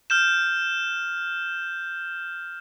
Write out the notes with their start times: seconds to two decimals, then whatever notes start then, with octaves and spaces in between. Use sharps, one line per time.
0.10 F6 G6 E7